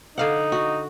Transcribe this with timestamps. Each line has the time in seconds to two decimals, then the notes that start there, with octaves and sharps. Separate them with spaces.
0.18 D3 D#4 F5 F#5
0.52 F#4